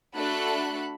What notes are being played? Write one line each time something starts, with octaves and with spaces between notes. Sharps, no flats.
A3 D4 F#4 A4 B5 F#6